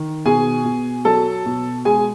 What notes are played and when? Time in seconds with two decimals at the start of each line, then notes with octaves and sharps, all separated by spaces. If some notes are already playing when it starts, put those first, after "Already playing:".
Already playing: D#3
0.26 B2 G#4 G#5
0.65 B2
1.05 F#3 A4 A5
1.46 B2
1.85 G#3 G#4 G#5